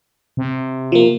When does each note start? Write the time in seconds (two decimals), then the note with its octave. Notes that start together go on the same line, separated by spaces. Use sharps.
0.37 C3
0.92 F3 A#3